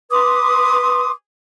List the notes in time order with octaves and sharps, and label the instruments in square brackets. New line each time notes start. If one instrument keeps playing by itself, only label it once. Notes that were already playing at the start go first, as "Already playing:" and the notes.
[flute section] B4 C6 D6 D#6